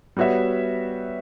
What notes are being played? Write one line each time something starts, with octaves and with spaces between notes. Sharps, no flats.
G3 B3 F#4 C#5 E5